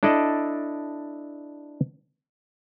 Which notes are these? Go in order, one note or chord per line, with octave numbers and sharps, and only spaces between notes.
D4 E4 A4 D5 D#5